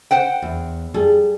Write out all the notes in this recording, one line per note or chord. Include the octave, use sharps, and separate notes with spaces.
C5 F#5 G5
E2
G3 G#4 A4